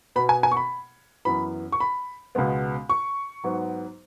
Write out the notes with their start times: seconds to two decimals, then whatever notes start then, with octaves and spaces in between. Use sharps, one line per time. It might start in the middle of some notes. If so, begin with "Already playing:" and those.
0.16 B2 B3 B5
0.29 G#5
0.43 G#5
0.51 C#6
0.57 B5
1.25 F#2 E3 B3 B5
1.72 C#6
1.80 B5
2.35 C#2 B2 G#3 B3
2.90 C#6
3.44 G#2 F#3 B3